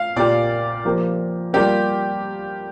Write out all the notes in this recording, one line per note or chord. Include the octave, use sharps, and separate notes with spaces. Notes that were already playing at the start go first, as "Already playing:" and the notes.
Already playing: F5
A#2 A#3 G4 D5
F3 A#3 G4
G3 A#3 F4 G4 A#4 D5